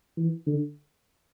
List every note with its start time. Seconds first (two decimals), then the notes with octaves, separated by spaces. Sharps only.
0.17 E3
0.47 D3